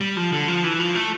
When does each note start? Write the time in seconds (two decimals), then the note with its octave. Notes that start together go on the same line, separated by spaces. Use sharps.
0.01 G3
0.17 F3
0.32 D3
0.48 F3
0.64 E3
0.80 F3
0.95 A3